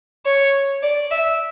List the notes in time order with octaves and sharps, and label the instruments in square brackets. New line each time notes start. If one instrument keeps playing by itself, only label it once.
[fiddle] C#5
D5
E5